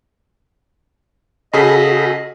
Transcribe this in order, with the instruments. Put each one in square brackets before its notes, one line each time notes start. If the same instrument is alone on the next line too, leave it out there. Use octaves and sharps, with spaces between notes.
[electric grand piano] C#3 G#4 [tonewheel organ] F#4 A4 B5 [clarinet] D#5